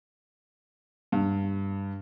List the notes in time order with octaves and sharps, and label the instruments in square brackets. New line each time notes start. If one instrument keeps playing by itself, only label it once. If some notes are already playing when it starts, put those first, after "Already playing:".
[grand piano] G2